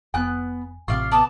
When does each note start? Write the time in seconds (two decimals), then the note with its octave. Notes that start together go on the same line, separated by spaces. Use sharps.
0.14 F1 B3 G#5 F#6
0.88 A1 C3 F4 D5 F5 C#6
1.11 B3 D5 A5